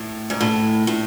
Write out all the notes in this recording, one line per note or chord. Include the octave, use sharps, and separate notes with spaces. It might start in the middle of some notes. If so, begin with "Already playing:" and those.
Already playing: A2
G#2
A2
A2